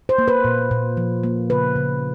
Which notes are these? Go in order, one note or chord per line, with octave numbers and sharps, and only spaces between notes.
C5
A#3
B4
A#2
A#2
F3
A#3
C#3 B4
C#3